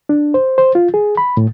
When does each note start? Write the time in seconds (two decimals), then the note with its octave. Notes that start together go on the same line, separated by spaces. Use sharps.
0.09 D4
0.34 C5
0.58 C5
0.75 F4
0.94 G#4
1.17 B5
1.37 A2